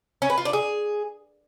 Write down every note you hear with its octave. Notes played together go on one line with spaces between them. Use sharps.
C#4
B4
F4
D4
G#4